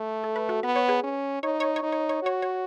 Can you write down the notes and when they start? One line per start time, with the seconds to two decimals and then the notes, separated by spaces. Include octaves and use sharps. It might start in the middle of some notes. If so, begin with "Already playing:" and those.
Already playing: A3
0.24 A4
0.36 B4
0.49 F#4 A4
0.63 B3 B4
0.76 C#5
0.88 G#4 B4
1.03 C#4
1.43 D#4 C#5
1.60 C#5
1.76 C#5
1.83 D#4
1.92 C#5
2.09 C#5
2.23 F#4 C#5
2.42 C#5